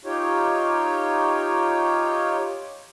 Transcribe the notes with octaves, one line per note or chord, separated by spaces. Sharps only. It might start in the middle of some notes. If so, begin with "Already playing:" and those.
D#4 F4 G4 C#5